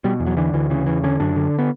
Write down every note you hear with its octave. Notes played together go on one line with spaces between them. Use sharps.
B2 G3
E2
F#3
D3 E3
D2 E3
C#3 E3
E2 E3
D3 C#4
F#2 D4
D3
B3